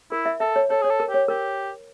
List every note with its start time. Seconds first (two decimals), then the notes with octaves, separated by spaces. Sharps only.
0.11 E4 A#4
0.26 E5
0.40 A4 E5
0.56 C#5
0.70 A4 C#5
0.82 G#4 C#5
0.90 A4
1.00 A#4
1.09 G4 C#5
1.28 G4 A#4